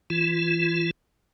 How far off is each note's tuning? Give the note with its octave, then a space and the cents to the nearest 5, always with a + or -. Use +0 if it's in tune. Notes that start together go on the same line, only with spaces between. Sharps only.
E3 +0 F4 -25